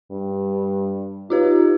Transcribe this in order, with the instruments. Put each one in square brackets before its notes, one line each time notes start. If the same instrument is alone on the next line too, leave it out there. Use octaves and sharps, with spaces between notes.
[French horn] G2
[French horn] D#4 [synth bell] F4 G4 B4